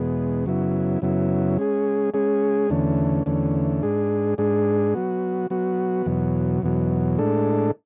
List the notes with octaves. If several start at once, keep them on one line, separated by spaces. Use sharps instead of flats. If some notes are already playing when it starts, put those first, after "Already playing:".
Already playing: E2 B2 G#3 B3
F#2 C#3 F#3 B3 E4
F#2 C#3 F#3 B3 E4
G#3 C#4 G#4
G#3 C#4 G#4
E2 D3 A3 C#4
E2 D3 A3 C#4
G#2 G#3 D4 G#4
G#2 G#3 D4 G#4
F#3 B3 F#4
F#3 B3 F#4
E2 B2 F#3
E2 B2 F#3
A2 G#3 D4 A4